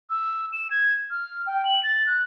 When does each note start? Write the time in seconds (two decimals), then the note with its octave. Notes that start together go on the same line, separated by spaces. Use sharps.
0.10 E6
0.53 E7
0.71 G#6
1.10 F6
1.47 G5
1.65 F#7
1.83 A6
2.07 F#6